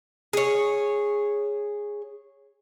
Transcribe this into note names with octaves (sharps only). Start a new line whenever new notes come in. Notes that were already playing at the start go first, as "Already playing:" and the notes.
G#4 C#5